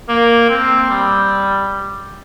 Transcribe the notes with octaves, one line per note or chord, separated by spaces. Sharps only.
A#3
C4
G3